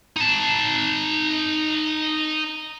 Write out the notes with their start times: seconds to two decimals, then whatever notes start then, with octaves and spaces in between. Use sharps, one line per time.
0.17 D#4 A5